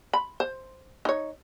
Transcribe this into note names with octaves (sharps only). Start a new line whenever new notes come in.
B5
C5
D#4 C#5